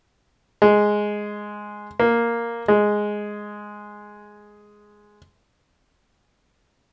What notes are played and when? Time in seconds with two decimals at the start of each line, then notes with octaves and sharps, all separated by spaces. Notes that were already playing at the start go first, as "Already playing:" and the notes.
0.62 G#3
2.00 A#3
2.68 G#3